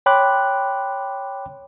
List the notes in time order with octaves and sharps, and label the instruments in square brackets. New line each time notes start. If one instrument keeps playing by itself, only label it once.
[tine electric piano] C#5 G5 B5 C6 D6 F#6